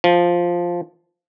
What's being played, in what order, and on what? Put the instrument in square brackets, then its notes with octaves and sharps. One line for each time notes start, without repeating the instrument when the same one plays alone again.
[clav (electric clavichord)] F3